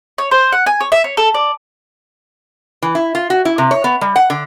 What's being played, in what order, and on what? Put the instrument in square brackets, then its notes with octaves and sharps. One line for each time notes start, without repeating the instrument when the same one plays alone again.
[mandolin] C#5
C5
F#5
G#5
C#5
E5
C#5
A4
D5
[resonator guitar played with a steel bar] E3
E4
F4
F#4
E4
C3
C#5
B3
G3
F#5
D3